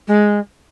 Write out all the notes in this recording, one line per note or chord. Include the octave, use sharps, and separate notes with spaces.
G#3